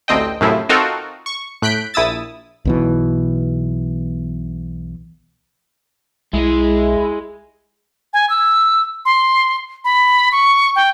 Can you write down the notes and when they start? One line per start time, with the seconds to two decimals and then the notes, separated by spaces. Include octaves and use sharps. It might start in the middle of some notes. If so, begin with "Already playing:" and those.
0.08 A1 D2 C4 D#5 G5
0.41 F#2 A2 C3 F3 E4
0.69 C4 D#4 F4 F#4 A4 A#4
1.26 C#6
1.62 A2 F#6 G6 B6 D7
1.94 A#1 E4 D#6 E6 A6
2.65 B1 B2 E3
6.33 B1 G#3 E4 G#4
8.13 G#5
8.30 E6
9.05 C6
9.85 B5
10.32 C#6
10.76 G5